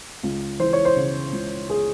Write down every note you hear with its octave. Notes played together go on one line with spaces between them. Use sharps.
C#2
E3 C5
C#5
C5
C#3
C#2
G#4